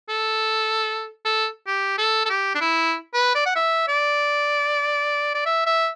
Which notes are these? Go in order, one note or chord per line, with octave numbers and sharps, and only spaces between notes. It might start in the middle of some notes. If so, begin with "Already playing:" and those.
A4
A4
G4
A4
A4
G4
D4
E4
B4
D5
F#5
E5
D5
D5
E5
E5